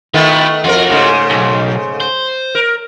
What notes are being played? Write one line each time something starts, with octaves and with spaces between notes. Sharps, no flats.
D#3 A3 B3 E4 F4
F2 F4 F#4 A#4
G#2 C#3 A3
B1
C5
A#4